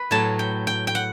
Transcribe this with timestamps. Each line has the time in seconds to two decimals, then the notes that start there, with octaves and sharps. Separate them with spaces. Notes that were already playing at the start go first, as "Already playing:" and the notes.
Already playing: B4
0.11 A2 F#3 A3 A5
0.39 G5
0.67 G5
0.87 G5
0.95 F#5